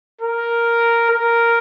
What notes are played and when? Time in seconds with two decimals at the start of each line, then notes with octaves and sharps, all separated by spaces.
0.21 A#4
1.10 A#4